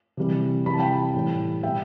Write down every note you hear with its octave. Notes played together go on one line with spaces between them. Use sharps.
C3 E3 G3
C3 E3 G3 B5
A5
G5 B5
A2 E3 G3
B2 G3 E5 G5